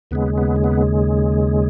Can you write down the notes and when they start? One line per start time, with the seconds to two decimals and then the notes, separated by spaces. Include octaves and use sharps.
0.11 D#2 C#3 G#3 B3
0.38 B3
0.64 B3